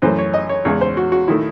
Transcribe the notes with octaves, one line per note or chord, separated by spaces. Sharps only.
F#2 E3 A3 C5
C#5
D#5
C#5
E2 C#3 G#3 C#5
C5
F#4
F#4
D#3 A3 E4